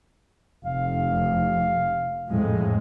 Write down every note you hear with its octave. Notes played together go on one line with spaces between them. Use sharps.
F1 F5
F2 A2 G#3